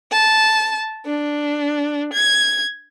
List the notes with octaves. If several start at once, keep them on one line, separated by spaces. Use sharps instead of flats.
A5
D4
G#6